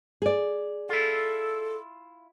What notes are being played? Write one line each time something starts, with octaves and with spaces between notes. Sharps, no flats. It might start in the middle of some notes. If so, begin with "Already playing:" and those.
G#4 D5
E4 F4 A4